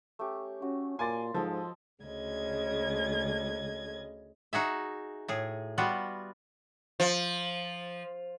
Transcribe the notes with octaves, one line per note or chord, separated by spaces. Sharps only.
A3 C#4 G4
C#4 F#4
A#2 F4 A#4 G#5 C6 D6 A6
G#2 F3 A4 D#5
D2 C#3 D#5 G#6
D#4 F#4 G#4 E5
A2 G#4
G3 B3 F4 F#4
F3